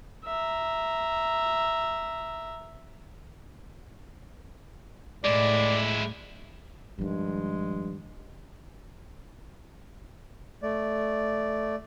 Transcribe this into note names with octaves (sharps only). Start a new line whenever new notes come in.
E5 A#5
A2 G#3 E4 D5
G2 D#3 F3 G#3
A3 D5